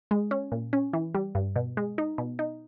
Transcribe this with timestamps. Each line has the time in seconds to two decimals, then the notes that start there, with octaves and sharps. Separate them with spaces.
0.11 G#3
0.31 C#4
0.52 A#2
0.73 C#4
0.93 E3
1.15 G3
1.35 G2
1.56 B2
1.77 G#3
1.98 D#4
2.18 B2
2.39 D#4